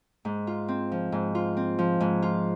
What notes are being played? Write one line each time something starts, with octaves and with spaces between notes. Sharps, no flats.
G#2
F4
C4
F3
G#2
F4
C4
F3
G#2
F4